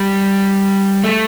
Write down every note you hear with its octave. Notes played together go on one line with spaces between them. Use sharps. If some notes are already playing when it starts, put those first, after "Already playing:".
Already playing: G3
A3